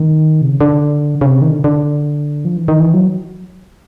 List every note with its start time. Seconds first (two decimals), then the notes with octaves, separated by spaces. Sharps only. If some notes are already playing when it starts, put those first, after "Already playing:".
Already playing: D#3
0.42 C3
0.50 C#3
0.61 D3
1.21 C#3
1.26 C3
1.42 D#3
1.51 D3
1.64 D3
2.45 F3
2.57 E3
2.68 D#3
2.80 E3
2.94 F#3